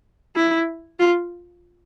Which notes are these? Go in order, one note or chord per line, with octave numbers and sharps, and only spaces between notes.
E4
F4